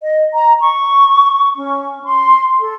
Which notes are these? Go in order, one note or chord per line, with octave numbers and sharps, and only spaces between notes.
D#5
A#5
C#6
C#4
C6
A4